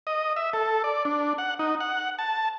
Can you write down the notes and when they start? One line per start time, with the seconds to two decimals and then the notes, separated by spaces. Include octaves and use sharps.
0.07 D#5
0.36 E5
0.53 A4
0.84 D5
1.05 D4
1.38 F#5
1.59 D#4
1.80 F#5
2.19 A5